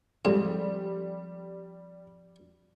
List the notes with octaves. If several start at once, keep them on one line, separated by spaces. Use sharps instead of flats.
G#2 F3 G3 C4 F4 A4